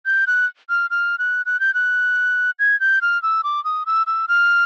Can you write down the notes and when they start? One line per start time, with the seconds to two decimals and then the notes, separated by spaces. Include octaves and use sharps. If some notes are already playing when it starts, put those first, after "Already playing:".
0.06 G6
0.27 F#6
0.70 F6
0.90 F6
1.19 F#6
1.46 F#6
1.60 G6
1.74 F#6
2.59 G#6
2.80 G6
3.02 F6
3.23 E6
3.44 D6
3.64 D#6
3.86 E6
4.07 E6
4.28 F6